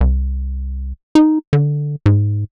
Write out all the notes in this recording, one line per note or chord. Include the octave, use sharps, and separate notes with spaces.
C2
D#4
D3
G#2